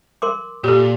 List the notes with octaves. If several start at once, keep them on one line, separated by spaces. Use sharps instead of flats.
A#4 C6 D6
A#2 G4 A4